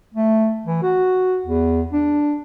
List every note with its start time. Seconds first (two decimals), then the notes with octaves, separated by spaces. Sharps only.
0.14 A3
0.66 E3
0.83 F#4
1.46 E2
1.93 D4